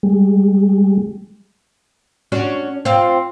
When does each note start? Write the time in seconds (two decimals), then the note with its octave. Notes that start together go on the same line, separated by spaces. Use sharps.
0.03 G3 G#3
2.32 C#4 D4 F#4
2.85 C4 F4